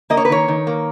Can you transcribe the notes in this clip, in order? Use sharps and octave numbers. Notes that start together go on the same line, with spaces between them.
A#3 D#5
C#5
B4
D#3 C#5
D#3
A#3